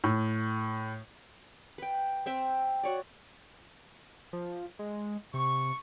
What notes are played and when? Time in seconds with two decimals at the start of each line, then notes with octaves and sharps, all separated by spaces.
0.04 A2
1.78 B4 G5
2.26 C4 E5 G5
2.83 F#4 C#5 D5
4.33 F3
4.79 G#3
5.34 C3 C#6